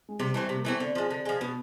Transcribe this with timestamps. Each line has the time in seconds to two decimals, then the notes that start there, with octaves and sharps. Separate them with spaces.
0.09 G#3
0.20 C3 G3
0.34 E3 A3 C4
0.49 C3
0.56 A#3
0.65 E3 A3 B3 C4
0.80 D3 C4
0.95 F3 G#3
1.10 D3
1.25 F3 G#3
1.41 B2 B3